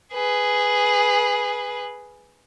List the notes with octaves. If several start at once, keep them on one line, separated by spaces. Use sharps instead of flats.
G#4 B4